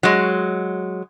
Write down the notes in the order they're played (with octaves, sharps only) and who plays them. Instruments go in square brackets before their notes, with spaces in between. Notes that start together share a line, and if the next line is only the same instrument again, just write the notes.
[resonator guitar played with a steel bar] F#3 G#3